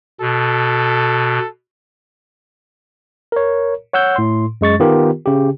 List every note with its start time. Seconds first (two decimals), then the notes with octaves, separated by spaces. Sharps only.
0.21 B2 A4
3.32 A#4 C#5
3.93 C#5 F#5 E6 G6
4.16 A2 C6
4.61 F#2 G#3 C#6 A6
4.80 D#3 B3 F4 G4 A#4
5.26 C#3 G4